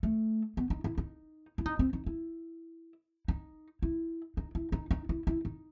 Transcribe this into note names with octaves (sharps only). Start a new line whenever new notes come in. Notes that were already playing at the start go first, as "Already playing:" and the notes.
A3
B3
D#4
E4
D#4
E4
D#4
C4
D#4
E4
D#4
E4
D#4
E4
D#4
D#4
E4
E4
D#4